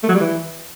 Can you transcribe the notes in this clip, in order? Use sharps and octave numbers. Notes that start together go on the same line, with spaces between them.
A3
F#3
G3
E3